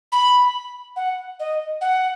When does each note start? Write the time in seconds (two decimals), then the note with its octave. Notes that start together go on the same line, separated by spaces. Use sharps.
0.12 B5
0.96 F#5
1.40 D#5
1.81 F#5